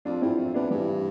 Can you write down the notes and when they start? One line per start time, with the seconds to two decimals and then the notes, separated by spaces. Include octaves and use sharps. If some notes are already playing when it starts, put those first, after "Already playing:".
0.05 F2 D4 F4
0.22 E2 C4 E4
0.38 F2
0.54 E2 B3 D4
0.71 G2 E3 G3